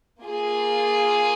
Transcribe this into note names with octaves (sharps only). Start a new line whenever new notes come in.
A#3 F4 G#4